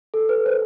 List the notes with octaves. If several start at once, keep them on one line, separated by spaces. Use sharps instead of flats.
A4
B4
C5